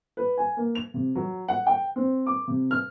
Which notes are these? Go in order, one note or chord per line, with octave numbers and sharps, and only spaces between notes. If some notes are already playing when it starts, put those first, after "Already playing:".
B4
G#5
A#3
F7
C3
F#3
F#5
G5
C4
D6
C3
F6